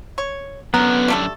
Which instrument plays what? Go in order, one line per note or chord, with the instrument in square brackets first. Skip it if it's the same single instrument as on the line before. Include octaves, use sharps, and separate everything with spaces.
[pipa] C#5
[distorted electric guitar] F#2 D3 [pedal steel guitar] B3 [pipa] A#4
[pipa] G3 A3 A4